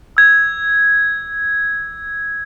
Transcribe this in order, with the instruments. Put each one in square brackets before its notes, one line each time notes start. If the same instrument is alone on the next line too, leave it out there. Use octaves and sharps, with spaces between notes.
[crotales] E6 G#6